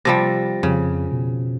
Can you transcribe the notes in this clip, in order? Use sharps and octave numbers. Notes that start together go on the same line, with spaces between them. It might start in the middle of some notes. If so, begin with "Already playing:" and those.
C3 F3 G3 A6 A#6
F2 C#3
B2